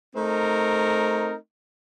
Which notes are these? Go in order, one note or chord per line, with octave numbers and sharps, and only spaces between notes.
A3 C4 D#4 A#4